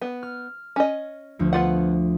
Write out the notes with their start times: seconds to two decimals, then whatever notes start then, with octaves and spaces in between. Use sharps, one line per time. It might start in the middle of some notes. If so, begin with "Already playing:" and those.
0.01 B3
0.23 F6
0.76 C#4 D#5
1.39 D2 F3 A3
1.53 B3 F4 F#5